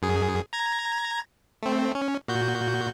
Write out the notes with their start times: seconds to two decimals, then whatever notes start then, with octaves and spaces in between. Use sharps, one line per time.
0.02 F#2 G#4
0.53 A#5 G#6 A#6
1.63 A3 C4
1.95 C#4
2.28 A#2 F#4 G6